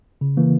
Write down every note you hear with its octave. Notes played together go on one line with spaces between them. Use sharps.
C#3
E3 A#3